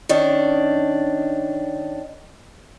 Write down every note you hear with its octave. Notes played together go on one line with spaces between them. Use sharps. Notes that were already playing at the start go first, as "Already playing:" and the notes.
D#3 C#4 D4